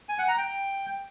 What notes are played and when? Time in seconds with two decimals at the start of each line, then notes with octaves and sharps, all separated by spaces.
0.09 G#5
0.19 F#5
0.28 A#5
0.38 G5